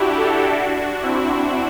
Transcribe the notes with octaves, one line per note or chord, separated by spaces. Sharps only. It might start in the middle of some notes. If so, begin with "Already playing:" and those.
Already playing: D4 E4 F#4 G4
F#4 A4
D4 F#4
C4 E4